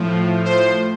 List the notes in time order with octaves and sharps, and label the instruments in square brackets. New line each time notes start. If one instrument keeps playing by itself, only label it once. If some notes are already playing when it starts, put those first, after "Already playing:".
Already playing: [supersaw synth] A2 F3
C5